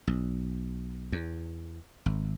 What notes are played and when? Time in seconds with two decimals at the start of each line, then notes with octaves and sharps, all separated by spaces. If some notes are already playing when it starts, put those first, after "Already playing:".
0.07 B1
1.12 E2
2.06 G#1